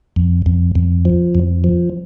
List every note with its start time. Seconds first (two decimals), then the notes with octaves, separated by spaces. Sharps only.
0.16 F2
0.46 F2
0.75 F2
1.05 F3
1.35 F2
1.64 F3